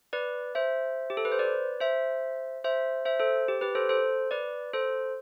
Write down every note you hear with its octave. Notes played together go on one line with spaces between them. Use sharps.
B4 D5
C5 E5
G4
A4
B4
C5
B4 D5
C5 E5
C5 E5
C5 E5
A4 C5
G4
G4 B4
A4 C5
A4 C5
B4 D5
A4 C5